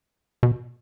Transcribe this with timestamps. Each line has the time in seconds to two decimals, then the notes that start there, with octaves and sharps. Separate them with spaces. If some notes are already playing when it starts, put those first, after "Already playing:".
0.43 B2